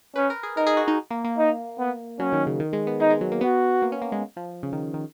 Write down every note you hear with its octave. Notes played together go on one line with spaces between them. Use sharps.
C#4 B4
A#4
G#4
D#4 A#4
G#4
F#4
D#4
A#3
A#3
D#4
B3
F#3 C#4
D#3
C#3
D#3
G#3
B3
G#3 D#4
G#3
F#3
A#3
B3 F#4
A#3
C#4
A#3
G#3
F3
C#3
D#3
D#3